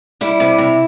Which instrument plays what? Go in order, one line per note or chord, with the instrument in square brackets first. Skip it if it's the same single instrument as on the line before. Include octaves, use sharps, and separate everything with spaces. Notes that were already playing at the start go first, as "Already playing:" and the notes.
[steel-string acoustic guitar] G3 E4
C3
C3